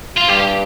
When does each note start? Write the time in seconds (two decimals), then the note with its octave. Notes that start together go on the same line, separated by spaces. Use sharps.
0.17 F4
0.28 G2 G4